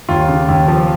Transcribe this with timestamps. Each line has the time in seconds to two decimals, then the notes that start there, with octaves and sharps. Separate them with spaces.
0.09 D#2 F4
0.28 C#3
0.48 D#2
0.68 F3